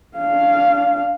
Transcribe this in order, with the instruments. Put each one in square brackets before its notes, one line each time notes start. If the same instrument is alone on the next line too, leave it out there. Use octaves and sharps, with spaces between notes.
[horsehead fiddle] D4 F5